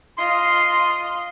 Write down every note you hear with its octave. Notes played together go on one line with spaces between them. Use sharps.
F4 D#5 C6